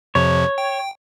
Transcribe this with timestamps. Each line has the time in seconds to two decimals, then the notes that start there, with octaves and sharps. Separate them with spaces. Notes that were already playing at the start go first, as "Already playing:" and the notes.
0.15 F2 C3 F3 C#5
0.58 G5